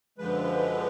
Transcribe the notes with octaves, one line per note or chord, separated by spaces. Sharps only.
F#2 D3 F3 G#3 B4